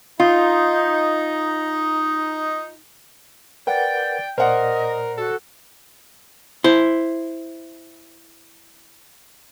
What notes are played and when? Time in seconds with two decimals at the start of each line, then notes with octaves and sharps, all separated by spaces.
0.20 D#4 F4
3.67 A#4 B4 D5 F#5 G5
4.38 A#2 A#4 C5 D5 D#5 F#5
5.18 F#4 A4
6.64 E4 C5